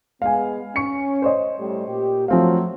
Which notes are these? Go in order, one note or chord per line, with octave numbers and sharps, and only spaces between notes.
G#3 B3 F5 G#5
C#4 C#6 C#7
C5 C#5 D#5
A2 G3
A#2 G4
F3 F#3 A3 C4 F5